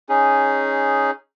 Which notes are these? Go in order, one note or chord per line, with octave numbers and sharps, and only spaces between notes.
C#4 D#4 G#4